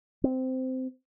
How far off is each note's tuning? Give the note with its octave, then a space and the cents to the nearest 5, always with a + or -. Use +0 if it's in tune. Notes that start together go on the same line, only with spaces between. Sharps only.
C4 -15